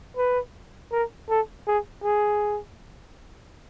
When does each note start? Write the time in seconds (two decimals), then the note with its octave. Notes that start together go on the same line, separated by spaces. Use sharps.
0.17 B4
0.92 A#4
1.29 A4
1.67 G#4
2.03 G#4